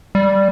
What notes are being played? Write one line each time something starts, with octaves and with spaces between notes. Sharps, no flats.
G3